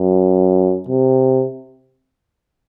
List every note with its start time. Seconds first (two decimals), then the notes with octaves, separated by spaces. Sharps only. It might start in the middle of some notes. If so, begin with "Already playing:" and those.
Already playing: F#2
0.88 C3